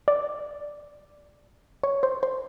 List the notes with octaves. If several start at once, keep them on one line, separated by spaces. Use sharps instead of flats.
D5
C#5
C5
C5